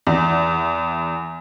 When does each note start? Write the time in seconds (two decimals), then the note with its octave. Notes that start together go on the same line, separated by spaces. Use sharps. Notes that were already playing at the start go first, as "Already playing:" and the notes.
0.07 E2